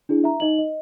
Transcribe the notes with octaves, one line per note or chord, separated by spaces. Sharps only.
D4 E4 G#4
E5 A#5
D#4 D#5 F#7
D#5